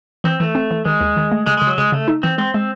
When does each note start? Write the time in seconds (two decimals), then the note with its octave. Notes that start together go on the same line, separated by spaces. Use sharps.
0.24 E3 C4
0.40 E3 A3
0.55 C4
0.71 E3
0.85 D#3 G#3
1.00 D#2
1.17 D#3
1.31 A3
1.46 C#3 G#3
1.57 C#3 G#3
1.67 F#3
1.78 C#3 G#3
1.92 C#3 A3
2.08 D#4
2.23 E3 C4
2.38 G#3 C4
2.54 G#3 C4